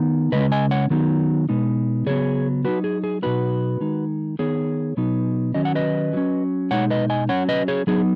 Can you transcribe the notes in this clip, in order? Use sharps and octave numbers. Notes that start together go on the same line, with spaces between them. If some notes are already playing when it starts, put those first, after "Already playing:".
Already playing: D#3 B3 D#4
C#3 G#3 C#4 B4 D#5
D#5 G#5
C#5 F#5
D#3 F#3 B3 D#4
B2 G#3 B3 D#4
C#3 F#3 B3 G#4 C#5
F#3 D#4 F#4 B4
G#4
G#4
B2 F#3 B3 D#4 F#4 B4
D#3 G#3 D#4
D#3 B3 D#4 G#4 C#5
B2 F#3 B3 D#4
D#3 F#3 C#4 D#5
F#5
B4 D#5
F#3 C#4
B2 G#3 D#4 C#5 F#5
B4 D#5
D#5 G#5
F#3 C#4 C#5 F#5
B4 D#5
G#4 C#5
F#3 B3 D#4 G#4